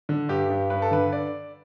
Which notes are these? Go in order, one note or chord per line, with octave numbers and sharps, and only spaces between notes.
D3
G2 G4
G2
G2 B4
A4
D3 B4
D5